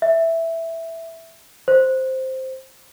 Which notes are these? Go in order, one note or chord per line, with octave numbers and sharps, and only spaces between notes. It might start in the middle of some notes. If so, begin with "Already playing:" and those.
E5
C5